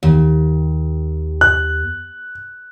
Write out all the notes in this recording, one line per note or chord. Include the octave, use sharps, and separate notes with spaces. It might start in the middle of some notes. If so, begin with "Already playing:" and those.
D#2
F#6